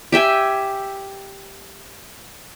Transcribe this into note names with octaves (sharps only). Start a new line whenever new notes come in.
G4 E5 G5 G#5